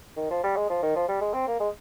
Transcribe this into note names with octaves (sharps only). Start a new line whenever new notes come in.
D#3
F3
G3
G#3
F3
D#3
F3
G3
G#3
C4
A#3
G#3